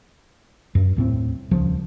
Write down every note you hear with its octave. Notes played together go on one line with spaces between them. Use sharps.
F#2
D#1 A2 C4
D#1 C#2 F3